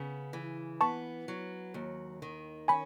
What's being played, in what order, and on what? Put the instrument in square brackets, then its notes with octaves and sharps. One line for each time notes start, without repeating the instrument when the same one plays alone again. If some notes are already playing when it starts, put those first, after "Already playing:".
Already playing: [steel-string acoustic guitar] C#3 B3
E3
[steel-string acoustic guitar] B3 [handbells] A5 C#6
[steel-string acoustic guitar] F#3
D#2
D#3
[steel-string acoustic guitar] C#4 [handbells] G#5 B5